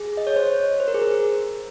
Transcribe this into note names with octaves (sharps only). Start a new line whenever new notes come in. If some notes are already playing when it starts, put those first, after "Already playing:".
Already playing: G#4
D#5
C#5
C5
C#5
C5
C5
A#4
G#4
A#4